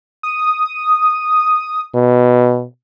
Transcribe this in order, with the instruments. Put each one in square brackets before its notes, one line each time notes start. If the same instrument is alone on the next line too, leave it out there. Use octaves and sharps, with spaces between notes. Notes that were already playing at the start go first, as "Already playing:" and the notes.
[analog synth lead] D#6
[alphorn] B2